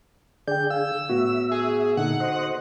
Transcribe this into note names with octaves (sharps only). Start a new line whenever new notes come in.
D3 G#4 D5 G5 G6
F5 E6
A2 B3 F#4 E5
G#4
A#2 D3 D#4 A4 F#5
C5 D#5